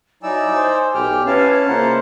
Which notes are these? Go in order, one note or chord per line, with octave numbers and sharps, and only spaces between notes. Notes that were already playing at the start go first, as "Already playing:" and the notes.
F#3 D#4 E4 D5 G#5 E6
C5
B1 G4 G5 F6
C#4 E4 B4 F5 A5
C#2 A#3 C5 F#5 A#5